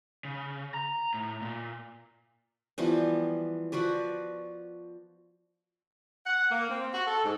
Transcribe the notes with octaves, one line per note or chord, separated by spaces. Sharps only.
C#3
A#5
A2
A#2
E3 F3 G3 B3
F3 F#4 B4 D5
F#5
A#3
C4
F#4
A4
G#2